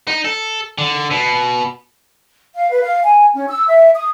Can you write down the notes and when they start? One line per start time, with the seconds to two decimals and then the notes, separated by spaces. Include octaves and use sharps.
0.08 D#4
0.25 A4
0.78 D3
1.11 B2
2.55 F5
2.70 B4
2.82 F5
3.04 G#5
3.35 C#4
3.49 E6
3.68 E5
3.95 D#6